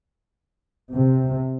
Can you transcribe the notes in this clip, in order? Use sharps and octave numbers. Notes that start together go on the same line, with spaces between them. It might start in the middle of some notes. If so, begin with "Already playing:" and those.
C3